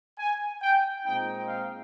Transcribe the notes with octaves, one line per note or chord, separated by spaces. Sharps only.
G#5
G5
A#2 G#3 C4 D#4 G5
F5